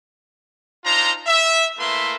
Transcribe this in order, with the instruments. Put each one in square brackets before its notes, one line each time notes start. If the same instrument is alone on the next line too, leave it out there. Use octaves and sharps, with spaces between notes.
[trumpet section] D4 D#4 F4 C5 A#5
E5
A3 A#3 E4 B4 E5 C6